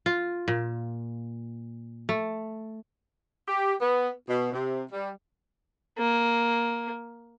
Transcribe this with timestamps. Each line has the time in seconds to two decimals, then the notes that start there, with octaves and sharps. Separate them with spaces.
0.06 F4
0.48 A#2
2.09 A3
3.48 G4
3.81 B3
4.29 B2
4.53 C3
4.92 G3
5.99 A#3